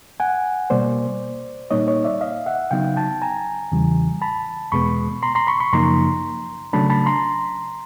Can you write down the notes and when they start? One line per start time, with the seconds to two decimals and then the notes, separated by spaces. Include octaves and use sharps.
0.20 F#5 G#5
0.70 B2 G3 A#3 C5 D5
1.71 A#2 G3 A#3 D#4 C#5 D#5
1.87 C#5 D#5
2.04 D5 E5
2.21 D#5 F5
2.46 E5 F#5
2.71 C#3 F#3 B3 D#4 F5 G5
2.96 G5 A5
3.22 G#5 A#5
3.72 E2 C#3 E3 G3
4.22 A5 B5
4.72 E2 B2 G#3 B3 B5 C#6
5.23 A#5 C6
5.35 A#5 C6
5.47 B5 C#6
5.60 B5 C#6
5.73 F#2 C#3 F3 A#3 D#4 A#5 C6
6.73 C#3 F#3 A3 D4 A5 B5
6.90 A5 B5
7.06 A#5 C6